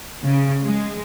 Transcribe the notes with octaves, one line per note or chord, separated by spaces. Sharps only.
C#3
G#3